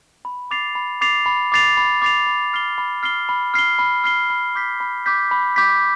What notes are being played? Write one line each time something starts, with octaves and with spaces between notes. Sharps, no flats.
B5
D6 A6 C7 F7
B5
D6 A6 C7 F7
B5
D6 A6 C7 F7
B5
D6 A6 C7 F7
B5
F6 C7 G7
B5
F6 C7 G7
B5
F6 C7 G7
B5
F6 C7 G7
B5
D6 G6 B6
B5
D6 G6 B6
B5
D6 G6 B6